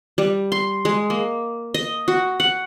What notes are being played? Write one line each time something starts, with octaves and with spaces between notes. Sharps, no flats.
G3
C6
G#3
A#3
D#5
F#4
F#5